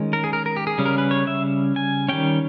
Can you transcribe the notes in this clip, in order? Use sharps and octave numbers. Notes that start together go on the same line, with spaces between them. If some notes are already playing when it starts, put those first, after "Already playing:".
Already playing: D#3 G#3 C#4
A#4
G#4
A#4
A#4
G4
G#4
C#3 G3 C#4
A#4
B4
C#5
E5
G#5
D#3 G3 C#4 G5